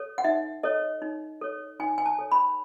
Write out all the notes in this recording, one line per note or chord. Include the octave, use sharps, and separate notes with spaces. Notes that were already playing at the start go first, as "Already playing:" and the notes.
Already playing: A4 C#5
F#5
D#4 E5
A4 C#5 D#5
D#4
A4 C#5
D#4 G#5
G#5
A5
A4 C#5
B5